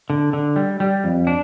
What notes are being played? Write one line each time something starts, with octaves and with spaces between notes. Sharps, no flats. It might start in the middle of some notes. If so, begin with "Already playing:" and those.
D3
D3
G3
G3
F2
D4